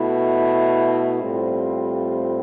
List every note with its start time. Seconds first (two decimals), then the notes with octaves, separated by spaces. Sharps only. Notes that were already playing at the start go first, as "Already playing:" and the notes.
Already playing: B2 A3 E4
1.20 A2 G3 C4 F4 C5